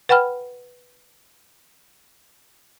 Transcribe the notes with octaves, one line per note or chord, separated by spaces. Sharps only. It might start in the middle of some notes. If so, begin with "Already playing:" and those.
B4 F#5 G5 B5 F6